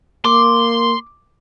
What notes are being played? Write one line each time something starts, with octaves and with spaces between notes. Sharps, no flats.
A#3 C6 D6